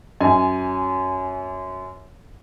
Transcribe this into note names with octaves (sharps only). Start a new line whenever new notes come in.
F#2 G#5